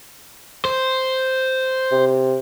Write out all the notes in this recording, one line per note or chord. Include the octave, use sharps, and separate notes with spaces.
C5
C3